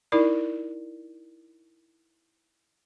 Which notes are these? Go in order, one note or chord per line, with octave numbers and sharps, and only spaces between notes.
D#4 E4 A#4 D5 B5